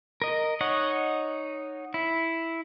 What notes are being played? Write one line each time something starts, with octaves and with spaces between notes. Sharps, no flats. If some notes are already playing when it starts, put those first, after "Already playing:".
A#4 D#5
D#4 C#5 D#5 F#5
E4